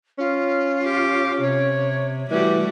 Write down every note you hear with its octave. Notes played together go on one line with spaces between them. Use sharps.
C#4 F4
G4
C3 C#5
E3 G3 A3 F#4 G4